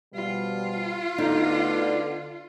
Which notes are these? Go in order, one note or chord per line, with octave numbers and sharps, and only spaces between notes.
B2 F3 G3 F4
D2 D3 B3 D#4